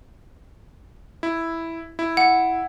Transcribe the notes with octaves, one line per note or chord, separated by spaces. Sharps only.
E4
E4
F#5